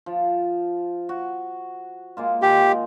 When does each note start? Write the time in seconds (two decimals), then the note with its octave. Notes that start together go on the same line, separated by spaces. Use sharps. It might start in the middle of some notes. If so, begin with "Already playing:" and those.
0.06 F3
1.09 F#4
2.17 G#3 A#3 F4
2.42 D#3 G#3 G4